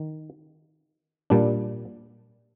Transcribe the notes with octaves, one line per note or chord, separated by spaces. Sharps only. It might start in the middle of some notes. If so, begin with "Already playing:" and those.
Already playing: D#3
A#2 G3 D4